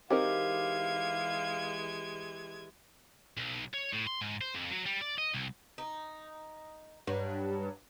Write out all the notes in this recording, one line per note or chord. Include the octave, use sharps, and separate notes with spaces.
E3 G#3 C4 D#4 G4 A#4 F5 G#6
B1
C#5
A2
C6
G#2
C5
F2
F#3
G3
D5
D#5
C2
D#4
G2 F#3